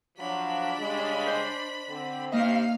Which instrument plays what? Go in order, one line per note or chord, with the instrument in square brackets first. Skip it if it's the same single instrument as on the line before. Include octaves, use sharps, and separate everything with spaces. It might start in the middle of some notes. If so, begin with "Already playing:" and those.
[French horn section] F3 F#3 [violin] D4 B5
[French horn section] C#3 G3 G#3
[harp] C5 D#5
[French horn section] D3 C4
[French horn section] G2 C3 [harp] A#3 D#4 D#5 [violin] F5